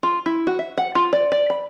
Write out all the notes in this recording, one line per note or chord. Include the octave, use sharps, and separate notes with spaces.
F4
E4
F#4
E5
F#5
F4
D5
D5
B5